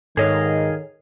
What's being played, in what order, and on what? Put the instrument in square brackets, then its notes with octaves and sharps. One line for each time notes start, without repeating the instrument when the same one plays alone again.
[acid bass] G#2 [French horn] D#3 [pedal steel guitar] G#4 D#5 F5 [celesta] A4 C#5